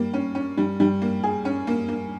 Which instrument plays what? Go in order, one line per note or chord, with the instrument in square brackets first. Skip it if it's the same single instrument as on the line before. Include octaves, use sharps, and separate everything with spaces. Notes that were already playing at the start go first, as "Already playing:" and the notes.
Already playing: [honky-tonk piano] G3 A#3
C#4
C#4
G3
G3
A#3
G#4
C#4
A#3
A#3